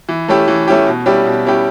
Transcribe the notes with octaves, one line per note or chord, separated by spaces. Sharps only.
E3
A3 C#4 E4 G4
E3
A3 C#4 E4 G4
B2
G3 C#4 E4 G4
B2
G3 C#4 E4 G4